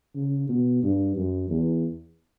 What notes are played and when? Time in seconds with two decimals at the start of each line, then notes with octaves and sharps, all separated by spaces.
0.15 C#3
0.49 B2
0.83 G2
1.16 F#2
1.49 E2